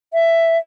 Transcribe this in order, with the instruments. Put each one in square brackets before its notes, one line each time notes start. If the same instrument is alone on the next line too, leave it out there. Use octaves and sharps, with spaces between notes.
[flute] E5